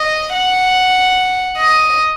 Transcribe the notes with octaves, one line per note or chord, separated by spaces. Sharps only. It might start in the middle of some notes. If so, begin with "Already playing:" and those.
Already playing: D#5
F#5
D#5